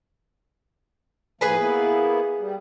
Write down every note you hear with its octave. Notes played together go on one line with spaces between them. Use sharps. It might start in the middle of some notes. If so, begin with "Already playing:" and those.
A2 F3 A#3 G#4 B4 G#5
A#3 B3 E4
G3